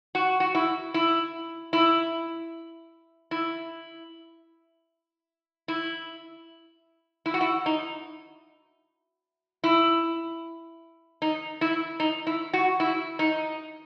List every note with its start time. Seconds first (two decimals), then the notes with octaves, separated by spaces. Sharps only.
0.15 F#4
0.40 F#4
0.55 E4
0.94 E4
1.73 E4
3.31 E4
5.68 E4
7.26 E4
7.34 F#4
7.41 E4
7.66 D#4
9.64 E4
11.22 D#4
11.61 E4
12.00 D#4
12.27 E4
12.53 F#4
12.80 E4
13.19 D#4